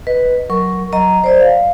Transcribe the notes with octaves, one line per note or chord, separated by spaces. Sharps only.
B4 D#5
F#3 A#4 C#6
F#3 D#5 A#5
C5 D5 D#5
F5